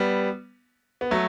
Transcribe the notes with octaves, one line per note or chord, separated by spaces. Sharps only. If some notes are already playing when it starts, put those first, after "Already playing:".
Already playing: G3 B3
B3
F#3 A3